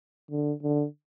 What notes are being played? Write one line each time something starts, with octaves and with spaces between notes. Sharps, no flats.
D3
D3